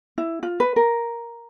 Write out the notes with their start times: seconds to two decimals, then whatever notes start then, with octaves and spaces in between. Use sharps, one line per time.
0.18 E4
0.43 F4
0.60 B4
0.76 A#4